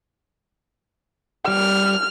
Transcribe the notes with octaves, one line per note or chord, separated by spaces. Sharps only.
G3 F6